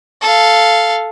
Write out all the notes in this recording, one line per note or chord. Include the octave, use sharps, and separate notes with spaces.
A4 F5